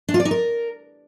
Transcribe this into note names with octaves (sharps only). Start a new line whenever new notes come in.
D4
F4
D5
D#4
A#4